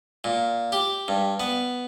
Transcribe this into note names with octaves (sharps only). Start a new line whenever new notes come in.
A#2
G4
G2
B3